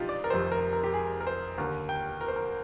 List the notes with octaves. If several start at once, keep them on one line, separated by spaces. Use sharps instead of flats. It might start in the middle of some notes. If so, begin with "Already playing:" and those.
Already playing: F1 F2 D4 D#4 F4 G4
D5
A#4
F1 F2 C3 D#3 C5
A#4
A#4
G4
G#4
A#4
C5
D#2 D3 A#4
G5
A#4
C5
A#4